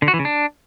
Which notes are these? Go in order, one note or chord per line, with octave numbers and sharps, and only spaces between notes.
D3
F#4
E3
C#3
D4